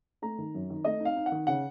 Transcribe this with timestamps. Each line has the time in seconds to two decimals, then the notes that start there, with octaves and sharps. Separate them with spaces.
0.22 A3 A#5
0.38 D#3
0.54 F#2
0.70 D#3
0.85 A3 D#5
1.00 D#4 F5
1.16 D#4
1.26 F#5
1.32 D#3
1.47 C#3 F#5